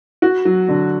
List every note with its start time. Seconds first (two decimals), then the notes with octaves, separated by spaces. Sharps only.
0.22 F#4
0.45 F#3
0.69 D3